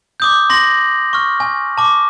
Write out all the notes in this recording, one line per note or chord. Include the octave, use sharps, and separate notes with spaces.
D6 D#6 G6
C6 A#6 F#7
C#6 F6
G#5
A5 D6